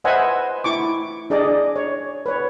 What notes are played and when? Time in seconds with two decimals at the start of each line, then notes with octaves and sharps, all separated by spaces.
0.04 B4 C5 D#5 E5 F#5 G#5
0.64 E4 C#6 D6
1.30 D4 G#4 D5 D#5
1.76 C#5
2.26 B4 C#5